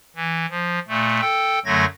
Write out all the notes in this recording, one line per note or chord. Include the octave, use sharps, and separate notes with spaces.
E3
F3
A#2 A3
A4 G5
F#2 D3 F#3 A3 G#6 A#6